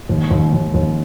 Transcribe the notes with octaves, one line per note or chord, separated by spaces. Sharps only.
D#2
D#2
D#2
D#2